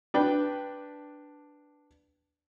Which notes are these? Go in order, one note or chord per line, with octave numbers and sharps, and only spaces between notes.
D4 B4 G5